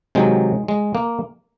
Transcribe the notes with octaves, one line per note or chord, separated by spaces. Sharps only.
C3 D#3 F#3 G#3
G#3
A#3